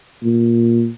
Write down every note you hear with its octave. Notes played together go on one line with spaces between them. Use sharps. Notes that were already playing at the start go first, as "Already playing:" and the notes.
A#2